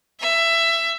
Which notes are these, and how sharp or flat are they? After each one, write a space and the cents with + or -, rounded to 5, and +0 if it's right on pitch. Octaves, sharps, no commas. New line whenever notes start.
E5 +15